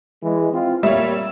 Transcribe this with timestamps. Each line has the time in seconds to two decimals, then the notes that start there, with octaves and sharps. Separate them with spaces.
0.23 E3 G#3
0.53 C4 F4
0.83 A#2 G3 A#3 C#5 E5